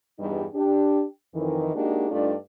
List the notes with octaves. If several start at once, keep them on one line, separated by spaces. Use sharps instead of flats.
E2 G2 G3 D#4
D4 G4
F2 D#3 E3
G#3 A#3 D4 D#4 F#4 G4
G2 A3 D4 D#4 F4 D5